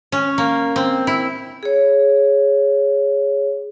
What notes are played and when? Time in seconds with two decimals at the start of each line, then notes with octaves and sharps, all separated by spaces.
0.12 C#4
0.38 A#3
0.76 C4
1.07 E4
1.63 G#4 C#5